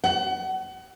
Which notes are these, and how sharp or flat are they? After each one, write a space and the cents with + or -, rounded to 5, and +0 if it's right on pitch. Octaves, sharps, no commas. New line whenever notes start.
F#5 +30